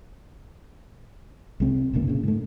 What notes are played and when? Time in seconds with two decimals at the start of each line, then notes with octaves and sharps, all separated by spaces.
1.60 C2 G#3 C4
1.93 F1 B2 D3 A#3
2.07 A#2 C#3
2.23 G#2 A3